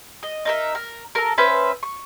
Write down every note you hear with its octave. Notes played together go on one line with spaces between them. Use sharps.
D#5
D#4 A#4 E5
A#4
A4 A#4
C#4 B4 C5 E5
C#6